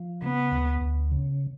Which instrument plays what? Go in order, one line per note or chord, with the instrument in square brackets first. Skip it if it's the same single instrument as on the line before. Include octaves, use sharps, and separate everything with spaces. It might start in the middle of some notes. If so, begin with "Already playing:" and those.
Already playing: [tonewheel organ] F3
[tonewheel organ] C#3 [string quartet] B3
[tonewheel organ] D2
D2
C#3